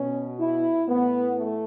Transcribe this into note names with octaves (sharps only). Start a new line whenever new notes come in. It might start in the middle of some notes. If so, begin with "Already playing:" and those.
Already playing: B2 C#4
E4
A2 E3 B3
A3